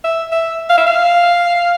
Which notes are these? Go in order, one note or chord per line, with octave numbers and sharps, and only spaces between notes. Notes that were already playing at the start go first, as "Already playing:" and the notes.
E5
E5
F5
E5
F5